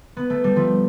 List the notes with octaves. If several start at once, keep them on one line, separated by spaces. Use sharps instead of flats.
B3
A3
G3
F3 A3